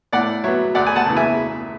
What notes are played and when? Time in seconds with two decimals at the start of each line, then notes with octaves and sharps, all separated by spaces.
0.13 A2 D5 F#5
0.44 F#3 B3 C#5 E5
0.75 D2 D5 F#5
0.86 G#5
0.96 F#5 A5
1.06 C#3 E3
1.16 E5 G#5